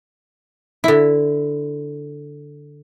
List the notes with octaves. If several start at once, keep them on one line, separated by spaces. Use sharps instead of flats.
D3 E4